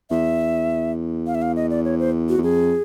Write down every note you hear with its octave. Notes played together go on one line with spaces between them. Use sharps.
E2 E5
F5
E5
F5
D#5
D5
C#5
C5
F#4
E2
F2 G#4